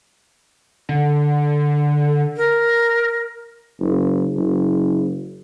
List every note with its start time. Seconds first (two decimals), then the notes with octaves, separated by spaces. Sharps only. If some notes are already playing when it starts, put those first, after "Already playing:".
0.89 D3
2.37 A#4
3.79 F#1
4.35 F#1